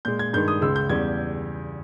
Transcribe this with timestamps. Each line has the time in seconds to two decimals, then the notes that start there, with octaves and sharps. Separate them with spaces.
0.05 A#2 G#3 G6
0.19 G#6
0.33 G2 D#3 G#3 G6
0.48 D#6
0.61 C#2 C#3 G#3 E6
0.76 G6
0.89 E2 C#3 G3 G#6